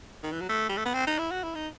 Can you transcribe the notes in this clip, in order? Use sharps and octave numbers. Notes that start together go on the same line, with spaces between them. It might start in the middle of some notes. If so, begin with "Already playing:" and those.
D#3
E3
F#3
A3
G3
A3
B3
C4
D#4
E4
F#4
E4
D#4